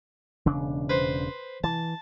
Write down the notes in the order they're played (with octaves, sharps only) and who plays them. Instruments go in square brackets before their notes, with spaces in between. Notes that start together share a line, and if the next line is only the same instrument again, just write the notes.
[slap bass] E1 C#3 D4
[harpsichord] B4 C5
[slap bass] E3 [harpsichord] A5